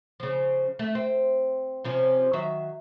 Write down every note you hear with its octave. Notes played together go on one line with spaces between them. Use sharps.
C#3 F3
A3
C4
C3 F3 C#4
D#3 F#3 E5